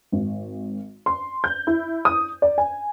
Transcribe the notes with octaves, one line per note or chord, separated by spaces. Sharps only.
G#1
C6
G6
E4
D#6
D5
G#5